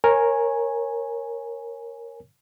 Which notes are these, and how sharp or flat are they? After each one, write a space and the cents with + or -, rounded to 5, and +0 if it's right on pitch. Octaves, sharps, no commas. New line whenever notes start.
A#4 +0 C#5 -20 G#5 +0